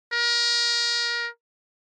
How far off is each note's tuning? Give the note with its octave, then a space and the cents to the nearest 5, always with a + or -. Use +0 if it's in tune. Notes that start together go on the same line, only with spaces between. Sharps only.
A#4 +25